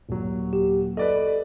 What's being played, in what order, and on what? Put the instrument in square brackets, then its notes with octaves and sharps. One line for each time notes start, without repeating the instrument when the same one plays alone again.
[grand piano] D#1 F#3
[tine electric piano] G4
[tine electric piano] A4 [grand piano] B4 D5 D#5